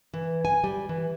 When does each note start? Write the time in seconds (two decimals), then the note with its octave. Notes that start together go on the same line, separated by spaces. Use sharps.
0.13 E3
0.45 G#5
0.64 G3
0.89 E3